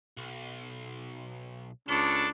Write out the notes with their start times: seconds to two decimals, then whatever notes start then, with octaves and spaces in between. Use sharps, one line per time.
0.17 B1
1.89 C#2 D4 A4